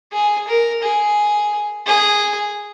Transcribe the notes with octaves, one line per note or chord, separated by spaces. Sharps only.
G#4
A#4
G#4
G#4